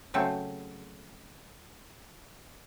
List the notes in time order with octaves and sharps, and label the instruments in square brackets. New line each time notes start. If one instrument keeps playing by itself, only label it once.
[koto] C#3 F#3 A3 C4